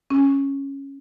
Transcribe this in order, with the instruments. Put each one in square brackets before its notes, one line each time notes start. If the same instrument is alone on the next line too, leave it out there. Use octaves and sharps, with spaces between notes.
[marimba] C#4